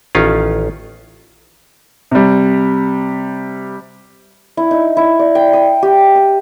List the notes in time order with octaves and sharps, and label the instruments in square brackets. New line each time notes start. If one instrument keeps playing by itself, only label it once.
[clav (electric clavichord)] A1 D#3 C#4 F4
[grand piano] C3 G3
[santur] E4
D#4
E4
D5
G5
D#6
G4
D#6